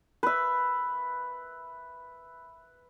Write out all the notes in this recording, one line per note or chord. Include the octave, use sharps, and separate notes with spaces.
B4 E5